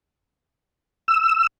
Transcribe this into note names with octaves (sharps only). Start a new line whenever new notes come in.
E6